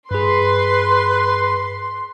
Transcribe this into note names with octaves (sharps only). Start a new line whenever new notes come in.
G2 G#4 B4 C6